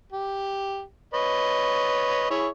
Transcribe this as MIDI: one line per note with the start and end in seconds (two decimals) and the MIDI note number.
0.12 0.82 67
1.14 2.28 71
1.14 2.28 73
1.14 2.28 75
2.30 2.48 64
2.30 2.48 68
2.30 2.48 73